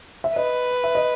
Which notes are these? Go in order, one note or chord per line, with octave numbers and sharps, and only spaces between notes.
E5
B4 D#5
E5
D#5